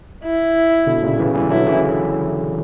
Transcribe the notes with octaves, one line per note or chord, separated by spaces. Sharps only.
E4
B2 D3
A#2 C#3
C#3 E3
E3 G3
D3 F#3 E4
C#3 E3